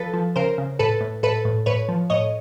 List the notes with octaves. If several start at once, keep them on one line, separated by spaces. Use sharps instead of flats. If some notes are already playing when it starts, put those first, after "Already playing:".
Already playing: F3 A4 B4
F3
C#3 A#4 C5
C#3
A2 A4 B4
A2
A2 A4 B4
A2
A2 B4 C#5
F3
A2 C#5 D#5